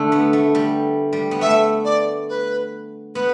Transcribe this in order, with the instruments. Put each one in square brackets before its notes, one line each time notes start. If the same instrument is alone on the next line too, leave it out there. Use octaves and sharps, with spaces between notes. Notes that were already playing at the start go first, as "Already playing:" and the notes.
Already playing: [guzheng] D3 A3
B3
A3
G3
G3
B3
[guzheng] A3 [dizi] E5
[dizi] D5
B4
[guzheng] B3 [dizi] B4